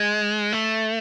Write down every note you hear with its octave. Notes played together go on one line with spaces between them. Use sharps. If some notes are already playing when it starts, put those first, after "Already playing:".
Already playing: G#3
A3